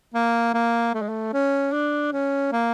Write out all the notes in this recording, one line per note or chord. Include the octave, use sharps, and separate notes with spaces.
A#3
A#3
A3
G#3
A3
C#4
D4
C#4
A#3